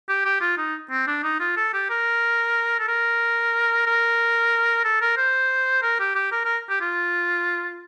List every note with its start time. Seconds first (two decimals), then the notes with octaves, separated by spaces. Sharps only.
0.09 G4
0.25 G4
0.41 F4
0.58 D#4
0.90 C4
1.07 D4
1.24 D#4
1.40 F4
1.57 A4
1.74 G4
1.90 A#4
2.79 A4
2.88 A#4
3.86 A#4
4.84 A4
5.01 A#4
5.17 C5
5.83 A#4
6.00 G4
6.15 G4
6.32 A#4
6.45 A#4
6.70 G4
6.81 F4